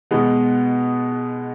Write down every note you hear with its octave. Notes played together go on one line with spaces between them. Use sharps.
B2 G#3 B3